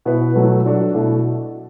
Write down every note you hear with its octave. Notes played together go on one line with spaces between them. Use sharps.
B2 B3 E4 B4
B2 F#3 A3 F#4
F#3 D4 F#4 A4
B2 A3 E4 A4